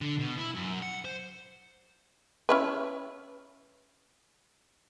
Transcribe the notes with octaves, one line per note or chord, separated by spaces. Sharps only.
D3
B2
E4
F#2
F#5
C5
C#4 E4 B4